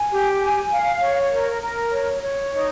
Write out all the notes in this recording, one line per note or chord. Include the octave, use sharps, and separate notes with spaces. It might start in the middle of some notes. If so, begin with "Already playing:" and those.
Already playing: G#5
G4
G#5
F5
C#5
A#4
A#4
C#5
C#5
D#4